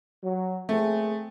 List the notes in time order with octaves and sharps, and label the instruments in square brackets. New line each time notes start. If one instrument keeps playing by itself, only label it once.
[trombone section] F#3
[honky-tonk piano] A3 [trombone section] A#3 C4 G#4